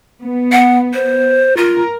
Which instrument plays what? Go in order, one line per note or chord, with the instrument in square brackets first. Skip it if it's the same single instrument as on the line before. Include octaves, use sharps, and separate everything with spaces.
[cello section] B3
[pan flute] F#5
C5
[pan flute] F4 [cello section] A#4